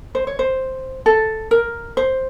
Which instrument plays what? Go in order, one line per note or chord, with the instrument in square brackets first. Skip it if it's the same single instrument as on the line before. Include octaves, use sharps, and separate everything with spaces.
[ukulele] C5
C#5
C5
A4
A#4
C5